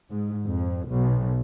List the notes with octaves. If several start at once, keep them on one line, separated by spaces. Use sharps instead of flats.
G#2
F2
B1